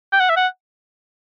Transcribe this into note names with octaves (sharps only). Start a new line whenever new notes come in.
G5
F#5
E5
F#5